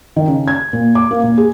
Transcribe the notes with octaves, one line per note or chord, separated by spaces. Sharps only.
D#3
C#3
G#6
A#2
D6
A#3
A#2
G#4